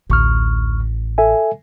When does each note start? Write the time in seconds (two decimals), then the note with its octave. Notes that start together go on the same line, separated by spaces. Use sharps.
0.10 A1 D2 C#6 F6
1.18 A4 E5 G#5